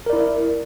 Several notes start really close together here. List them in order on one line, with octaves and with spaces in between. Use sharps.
A#4 D5 E4